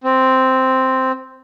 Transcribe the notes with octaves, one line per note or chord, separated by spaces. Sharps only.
C4